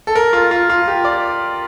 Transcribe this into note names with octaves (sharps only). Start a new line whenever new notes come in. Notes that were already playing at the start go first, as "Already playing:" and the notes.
A4
A#4
F4
F4
F4
G4
D5